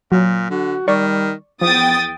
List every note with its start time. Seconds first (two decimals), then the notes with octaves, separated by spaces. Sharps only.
0.12 A#2 F#3
0.50 D3 F#4
0.88 D#3 G3 D5 C#6
1.61 E2 F3 B3 G5 D#6 A6